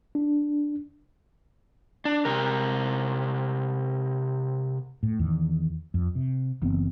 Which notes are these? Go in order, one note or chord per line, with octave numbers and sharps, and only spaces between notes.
D4
D4
C3 A#4
A2
E2 D#3
F2
C3
F#1 E3 B3 C4